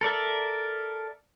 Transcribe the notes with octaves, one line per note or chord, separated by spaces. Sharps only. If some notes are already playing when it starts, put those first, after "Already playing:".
A4 A#4 D5 E5